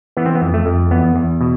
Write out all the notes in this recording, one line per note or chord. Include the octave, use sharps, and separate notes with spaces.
E3 B3
C4
B3
F2
A3
F2
E2 B3
E2
B2